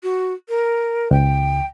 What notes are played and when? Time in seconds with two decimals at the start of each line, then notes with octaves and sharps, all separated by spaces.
0.03 F#4
0.48 A#4
1.11 C#2 G5